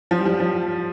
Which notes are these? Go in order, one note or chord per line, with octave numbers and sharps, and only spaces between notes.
F3
G3
F3
F3